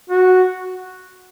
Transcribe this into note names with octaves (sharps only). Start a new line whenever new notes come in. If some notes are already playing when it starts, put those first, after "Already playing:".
F#4